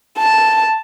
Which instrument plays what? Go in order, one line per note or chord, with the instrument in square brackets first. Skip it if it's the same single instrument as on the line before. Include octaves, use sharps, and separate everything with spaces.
[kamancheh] A5